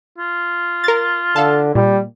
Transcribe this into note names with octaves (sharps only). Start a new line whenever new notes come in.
F4
A#4 A6
D3 A4 F5 A5
A#2 G3